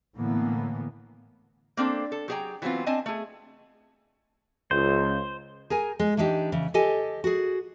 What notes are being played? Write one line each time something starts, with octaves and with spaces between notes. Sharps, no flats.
A2 D3 E3 A#3 B3
A#3 C4 D4 A4 C5
A4
F#3 G4 G#4 C#5 G5 A#5
E3 F#3 B3 C4 F4
C4 D4 D#5 G#5 A5
A3 G#4
C#2 C5
G#4 A#4 G#5
G#3
E3 D4 D#4 G4
C#3 E3
G4 A4 D#5 G#5
F#4 G#4